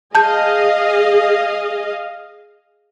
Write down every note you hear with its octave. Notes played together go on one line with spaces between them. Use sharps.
G#4 D#5 F5 A5 G6